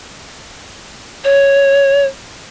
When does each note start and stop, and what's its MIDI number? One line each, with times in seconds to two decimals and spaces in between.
1.24 2.06 73